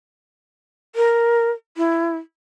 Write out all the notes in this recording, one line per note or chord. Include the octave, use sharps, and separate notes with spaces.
A#4
E4